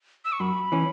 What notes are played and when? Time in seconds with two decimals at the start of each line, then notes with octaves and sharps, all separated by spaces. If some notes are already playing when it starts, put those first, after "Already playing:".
0.25 E6
0.32 C#6
0.40 F#2 B5
0.72 E3 C#4